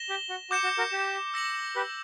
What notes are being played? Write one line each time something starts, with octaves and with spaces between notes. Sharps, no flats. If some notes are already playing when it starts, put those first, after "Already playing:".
Already playing: A#6 E7 G7
G4
F#4
F#4 D6 G6 C#7 E7
F#4
F#4 A#4
G4
E6 A#6 C#7 F#7
G4 B4